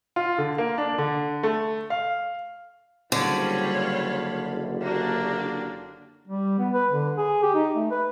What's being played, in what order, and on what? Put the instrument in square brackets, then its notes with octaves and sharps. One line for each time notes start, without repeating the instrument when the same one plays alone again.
[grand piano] F4
D3
A#3
D4
D3
A3
F5
[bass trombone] F#1 [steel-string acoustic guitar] D3 [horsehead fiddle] G3 C#5 [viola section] C5 F5 B5
[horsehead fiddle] A#3 F#4 [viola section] D4 G4
[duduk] G3
B3
B4
D3
G#4
G4
D#4
A3
B4